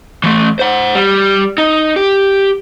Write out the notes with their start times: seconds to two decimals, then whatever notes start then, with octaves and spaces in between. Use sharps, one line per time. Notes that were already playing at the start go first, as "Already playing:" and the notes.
0.24 E3 A3
0.59 C5 F#5
0.95 G3
1.58 D#4
1.96 G4